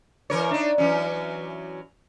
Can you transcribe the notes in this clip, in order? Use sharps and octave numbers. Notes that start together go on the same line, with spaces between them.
E3 A#4 C#5
D4 D#4
E3 F#3 C#4